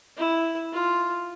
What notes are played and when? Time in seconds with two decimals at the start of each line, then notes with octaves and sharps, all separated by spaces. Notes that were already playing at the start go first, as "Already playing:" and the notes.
0.17 E4
0.73 F4